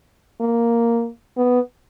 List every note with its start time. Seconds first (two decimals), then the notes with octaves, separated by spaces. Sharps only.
0.41 A#3
1.37 B3